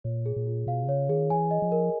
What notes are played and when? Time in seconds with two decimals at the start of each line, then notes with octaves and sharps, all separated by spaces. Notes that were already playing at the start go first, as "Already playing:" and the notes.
0.04 A#2 C#5
0.26 G#4
0.36 A#2
0.47 F4
0.67 B2 F5
0.83 C3
0.88 C#3 C#5
1.09 D#3 G#4
1.30 E3 G#5
1.51 D#5
1.62 F3
1.72 A#4